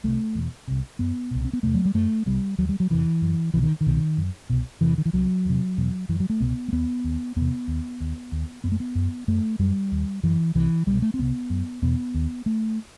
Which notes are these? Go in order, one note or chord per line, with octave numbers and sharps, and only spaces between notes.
C2 C3 A3
E2 B2
C2 C3
F#2 B3
C2 B2
C4
B3
E2 C3 A3
F#3
G3
F#2 A3
C2 C3 G3
D#2 F#3
G3
F#3
E2 C3 E3
F#2
C2 B2 E3
D#3
D#3
C2 B2
F#2
C2 B2
E2 C3 E3
D#3
E3
C2 C3 F#3
E2 C3
E2 B2
F#2 E3
F#3
A3
C2 B2 B3
A3
D#2 B3
D#2
E2 C3 B3
D#2
D#2
D#2
F#2 B3
A3
B3
F#2
F#2 A3
F#2 G3
D#2
F#2 E3
C2 C3 E3
C2 B2 G3
A3
C4
C2 C3 B3
F#2
E2 B2 B3
D#2
A3